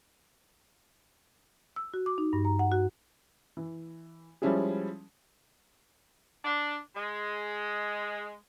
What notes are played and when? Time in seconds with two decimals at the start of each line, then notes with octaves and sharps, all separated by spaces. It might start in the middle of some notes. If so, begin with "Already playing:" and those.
1.76 E6
1.94 F#4
2.06 D6
2.18 D#4
2.33 G2
2.45 A#5
2.59 F#5
2.72 F#4
3.57 E3
4.42 F3 G3 G#3 C#4 E4 G#4
6.44 D4
6.96 G#3